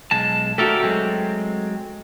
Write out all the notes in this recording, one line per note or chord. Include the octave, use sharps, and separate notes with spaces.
B1 G#3 A5
A3 F#4 G4 A4 A#4
F#3 G#3 C4